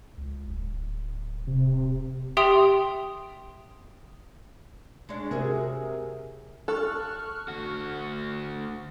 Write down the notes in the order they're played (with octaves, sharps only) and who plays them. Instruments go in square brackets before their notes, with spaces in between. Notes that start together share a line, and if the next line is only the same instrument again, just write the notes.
[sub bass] C#2
D1
[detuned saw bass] C3
[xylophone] G4 E5 G5 C6 D#6 F7
[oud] G#3 C#4 D4
[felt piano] C3 A#4 [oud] F#4 G#4
[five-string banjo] A4 [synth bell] C#6 F6 F#6
[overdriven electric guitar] D2 F#4